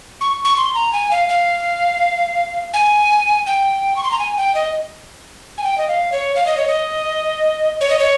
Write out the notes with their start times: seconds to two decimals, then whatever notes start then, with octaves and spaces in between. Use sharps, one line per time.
0.21 C#6
0.45 C#6
0.57 C6
0.75 A#5
0.93 G#5
1.11 F5
1.29 F5
2.74 G#5
3.47 G5
3.96 C#6
4.04 C6
4.11 A#5
4.19 G#5
4.37 G5
4.55 D#5
5.58 G#5
5.64 G5
5.78 D#5
5.88 F5
6.12 C#5
6.36 F5
6.47 D#5
6.57 C#5
6.67 D#5
7.81 C#5
7.90 D#5
7.99 C#5